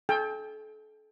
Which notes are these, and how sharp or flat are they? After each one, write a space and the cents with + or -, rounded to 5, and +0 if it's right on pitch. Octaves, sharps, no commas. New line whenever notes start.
A4 -35 G5 +25